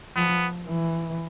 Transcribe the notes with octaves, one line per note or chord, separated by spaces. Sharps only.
F3 B3
E3